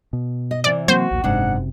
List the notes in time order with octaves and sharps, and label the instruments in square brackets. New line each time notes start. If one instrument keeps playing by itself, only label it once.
[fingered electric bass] B2
[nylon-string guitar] D#5
[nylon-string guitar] C3 E3 [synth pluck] D5
[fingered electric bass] F#3 A#3 C4 [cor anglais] F#4 [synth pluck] C5
[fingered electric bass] A#1 D#2 A#2
[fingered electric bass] F#1 C3 [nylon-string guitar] G#2 D4 [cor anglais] F#5